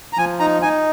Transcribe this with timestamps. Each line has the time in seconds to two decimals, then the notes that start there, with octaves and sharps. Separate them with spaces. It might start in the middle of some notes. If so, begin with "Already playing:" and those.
0.13 A#5
0.18 F3 G#5
0.39 D#4 A#5
0.62 D#4 G#5